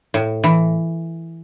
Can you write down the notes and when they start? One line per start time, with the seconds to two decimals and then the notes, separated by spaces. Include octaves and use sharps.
0.14 A2
0.44 E3